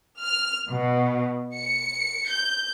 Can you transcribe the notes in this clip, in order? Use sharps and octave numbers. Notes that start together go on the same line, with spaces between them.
F6
B2
C#7
G6